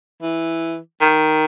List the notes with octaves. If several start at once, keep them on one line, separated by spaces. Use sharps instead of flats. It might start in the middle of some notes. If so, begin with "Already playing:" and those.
E3
D#3